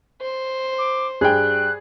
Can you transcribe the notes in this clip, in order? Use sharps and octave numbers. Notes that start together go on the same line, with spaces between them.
C5
D6
G2 G#4 G5 F#6